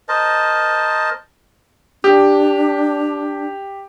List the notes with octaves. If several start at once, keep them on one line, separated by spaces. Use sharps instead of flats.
A#4 C5 D#5 A5
D4 G4